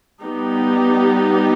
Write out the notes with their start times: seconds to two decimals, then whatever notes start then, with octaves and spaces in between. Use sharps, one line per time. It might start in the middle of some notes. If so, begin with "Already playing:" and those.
0.22 G3 B3 D#4 G4